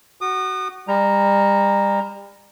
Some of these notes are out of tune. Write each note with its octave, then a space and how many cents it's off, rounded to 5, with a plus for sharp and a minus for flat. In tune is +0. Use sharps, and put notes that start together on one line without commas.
F#4 +15 D#6 -35
G3 +35 A#5 +0